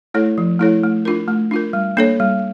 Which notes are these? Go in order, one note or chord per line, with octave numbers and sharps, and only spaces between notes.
A3 E4 A4 C#5
F3
A3 E4 A4 C#5
A3
D4 F4 A#4
A3
D4 F4 A#4
G3
A#3 D4 A4 C#5
G3